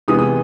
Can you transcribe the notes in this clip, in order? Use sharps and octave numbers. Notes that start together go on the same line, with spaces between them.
C3 E3 G#3 B3 D#6
D#6